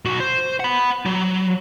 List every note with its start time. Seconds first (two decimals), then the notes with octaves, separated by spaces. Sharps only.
0.05 B1 F#4
0.20 C5
0.60 F#5 B5
1.06 F#3